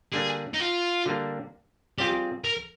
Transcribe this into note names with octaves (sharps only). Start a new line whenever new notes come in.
D3 G3 A#3 D4 G#4
D#4
F4
D3 G3 A#3 D4
G3 C4 F4 G4 G#4
A#4